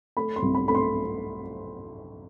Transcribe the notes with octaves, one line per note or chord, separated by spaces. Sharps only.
A3 B5
C6
C2
B5
A3 B5
C6